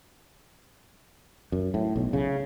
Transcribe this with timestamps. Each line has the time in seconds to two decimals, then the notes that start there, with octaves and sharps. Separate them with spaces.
1.52 F#2
1.74 A2
1.96 B1
2.13 C#3